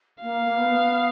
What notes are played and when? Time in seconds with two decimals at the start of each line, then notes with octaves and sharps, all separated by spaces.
0.22 A#3 F5
0.45 A#3
0.56 B3